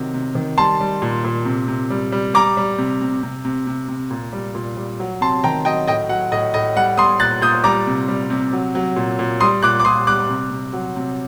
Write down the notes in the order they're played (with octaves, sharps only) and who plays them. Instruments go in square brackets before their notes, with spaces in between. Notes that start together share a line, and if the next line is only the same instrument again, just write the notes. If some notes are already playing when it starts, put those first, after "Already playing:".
Already playing: [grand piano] C3 D#3 F#3
C3
D#3
G3 A5 C6
G3
A#2
A#2
C3
C3
G3
G3
G3 A#5 D6
G3
C3
C3
C3
C3
C3
C3
A#2
G3
A#2
G3
F#3
C3 A5 C6
D#3 G5 A#5
F#3 D#5 G5
A2 D#5 G5
F#3 F#5
A2 D#5
A2 D#5
G3 F#5
G3 C6 D#6
A#2 F#6 A6
A#2 D#6 G6
G3 A#5 D6
C3
G3
C3
F#3
F#3
A#2
A#2
G3 C6 D#6
A#2 D6 F#6
D6
A#2 C6 D#6
G3 D6 F#6
C3
C3
F#3
C3